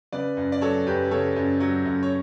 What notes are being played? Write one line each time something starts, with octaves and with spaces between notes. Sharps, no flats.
C#3 B4 D5
F#2
D5
F#3 A4 C#5
F#2 G4 B4
C#3 A4 C#5
F#2
F#3
F#2
C#5